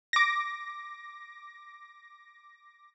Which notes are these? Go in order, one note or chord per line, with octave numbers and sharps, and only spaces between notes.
D6 A#6